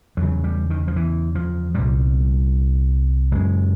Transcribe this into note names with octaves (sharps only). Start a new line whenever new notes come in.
E2 C#3 F#3
G3
D#3
F3
E3
F3
C2 A#2 G3
F#2 C#3 G#3